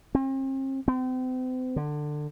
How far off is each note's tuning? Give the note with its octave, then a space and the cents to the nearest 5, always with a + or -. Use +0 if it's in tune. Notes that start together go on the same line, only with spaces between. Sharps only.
C4 +40
C4 -40
D3 +20